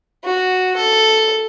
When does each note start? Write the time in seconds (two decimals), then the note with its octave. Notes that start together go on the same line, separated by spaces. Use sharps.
0.24 F#4
0.76 A4